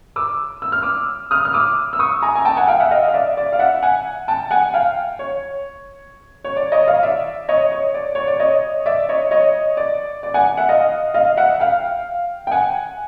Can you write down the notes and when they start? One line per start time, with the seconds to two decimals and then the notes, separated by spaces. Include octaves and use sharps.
0.16 D6 E6
0.62 E6
0.72 F6
0.83 D6 E6
1.31 D#6 F6
1.45 F6
1.53 D6 E6
1.93 E6
1.99 C#6 D#6
2.22 G#5 A#5
2.35 G#5
2.45 G5 A5
2.57 F#5 G#5
2.68 F5 G5
2.80 E5 F#5
2.91 D#5 F5
3.08 F5
3.13 D5 E5
3.37 D5
3.52 F5
3.59 E5 F#5
3.83 F#5 G#5
4.28 G5 A5
4.51 F#5 G#5
4.74 F5 G5
5.19 C#5
6.44 C#5
6.56 D5
6.72 C#5 D#5
6.87 D#5 F5
7.03 D5 E5
7.49 C#5 D#5
7.72 C#5
7.94 D5
8.15 C#5
8.28 D5
8.40 C#5 D#5
8.86 D5 E5
9.09 C#5 D#5
9.31 C#5 D#5
9.77 D5
10.23 D5
10.34 F#5 G#5
10.57 E5 F#5
10.69 D#5 F5
11.14 D#5 F5
11.37 E5 F#5
11.60 F5 G5
12.47 G5
12.51 F#5 G#5